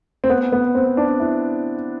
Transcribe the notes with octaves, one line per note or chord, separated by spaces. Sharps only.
C4
B3
B3
C4
D4
E4